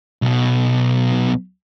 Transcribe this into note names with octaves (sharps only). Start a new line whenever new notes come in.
B1 B2